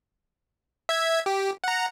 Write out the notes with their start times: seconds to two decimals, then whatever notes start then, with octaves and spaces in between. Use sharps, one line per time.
0.89 E5 G#6
1.26 G4
1.64 F#5 A#5